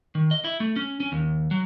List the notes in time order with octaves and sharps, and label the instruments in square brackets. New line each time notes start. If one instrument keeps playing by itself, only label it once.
[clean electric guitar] D#3
D#5
E4
A3
C#4
C#4
D#2
F#3